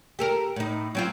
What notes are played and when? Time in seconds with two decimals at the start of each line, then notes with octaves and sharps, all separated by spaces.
0.19 G4 A4 A#4
0.56 A2 D#4
0.95 F#3 C4 F4